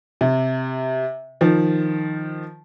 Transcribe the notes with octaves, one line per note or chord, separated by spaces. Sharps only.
C3
D#3 F3